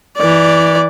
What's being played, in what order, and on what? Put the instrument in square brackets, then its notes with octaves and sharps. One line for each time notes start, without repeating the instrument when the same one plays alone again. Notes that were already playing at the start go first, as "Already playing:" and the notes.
[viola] E3 D5